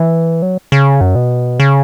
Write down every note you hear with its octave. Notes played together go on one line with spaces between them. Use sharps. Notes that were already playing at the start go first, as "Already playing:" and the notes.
Already playing: E3
F#3
C#3
F#2
B2
C#3